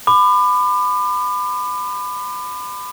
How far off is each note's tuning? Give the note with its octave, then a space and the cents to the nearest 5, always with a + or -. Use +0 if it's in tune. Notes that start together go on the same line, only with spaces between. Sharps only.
B5 +20 D6 +35